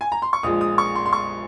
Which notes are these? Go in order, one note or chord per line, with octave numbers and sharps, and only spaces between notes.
G#5
A#5
C6
C#6
A#1 A#2 G#3 D#6
D#6
C#6
C6
C6
C#6